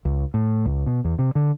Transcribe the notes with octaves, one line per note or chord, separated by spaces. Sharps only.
C#2
A2
C#2
B2
E2
C3
D3